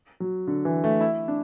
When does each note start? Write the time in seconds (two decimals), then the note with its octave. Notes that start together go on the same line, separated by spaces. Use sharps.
0.20 F#3
0.47 D3
0.65 E3
0.84 A3
1.01 E4
1.28 D4